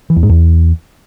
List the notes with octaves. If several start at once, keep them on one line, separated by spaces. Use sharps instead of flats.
E3
E2
G#2
E2